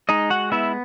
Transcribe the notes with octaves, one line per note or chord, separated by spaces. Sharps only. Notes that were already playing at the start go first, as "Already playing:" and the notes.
G#3 D#4 D#5
F#4 F#5
B3 E4 E5